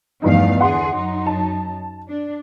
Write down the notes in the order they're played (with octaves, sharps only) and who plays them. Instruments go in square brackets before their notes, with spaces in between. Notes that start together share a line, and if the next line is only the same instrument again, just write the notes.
[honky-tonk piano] E2 G2 D#4 [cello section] F3 A3 F5
[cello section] E2 D3 G#4 [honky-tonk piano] F#5 C6
[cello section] F#2 F#3 D#4
[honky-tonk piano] A5
[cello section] D4